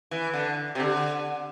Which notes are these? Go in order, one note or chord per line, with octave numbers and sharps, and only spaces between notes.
E3
D3
C3
D3